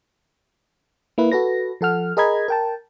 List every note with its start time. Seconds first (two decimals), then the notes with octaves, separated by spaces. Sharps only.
1.18 A#3 E4 B4
1.32 F#4 A4 B4 A#6
1.81 F3 A4 F#5 F6
2.17 G#4 A#4 D#5 A#5 B5 G#6
2.48 A#4 G5 A5